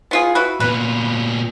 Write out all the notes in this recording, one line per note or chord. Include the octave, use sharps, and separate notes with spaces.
B3 F4 G#4
E4 F#4 B4
A#2 B3 B4